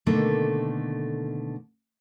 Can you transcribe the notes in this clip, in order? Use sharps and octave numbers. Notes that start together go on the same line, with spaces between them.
B2 D3 D#3 A3 A#3